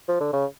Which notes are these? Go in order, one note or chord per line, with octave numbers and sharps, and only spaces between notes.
F3
D3
C#3